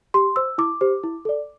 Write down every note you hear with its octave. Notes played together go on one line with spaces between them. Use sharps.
G4 C6
C5 E6
E4 D6
G4 C5
E4
A4 D5